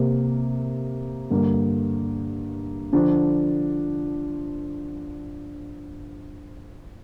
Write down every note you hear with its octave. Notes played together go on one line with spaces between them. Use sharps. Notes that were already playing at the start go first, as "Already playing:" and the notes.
Already playing: C3 A#3 G4 A#4
G2 D3 A#3
D3 F3 D4